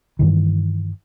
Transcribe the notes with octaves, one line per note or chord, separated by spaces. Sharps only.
G2 D#3 E3